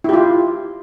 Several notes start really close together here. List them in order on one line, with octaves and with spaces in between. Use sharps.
E4 G4 F4